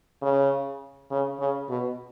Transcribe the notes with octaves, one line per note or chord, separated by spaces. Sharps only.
C#3
C#3
C#3
B2